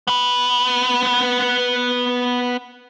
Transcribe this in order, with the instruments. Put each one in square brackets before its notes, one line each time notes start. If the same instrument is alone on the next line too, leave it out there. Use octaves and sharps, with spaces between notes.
[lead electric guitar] B3 B4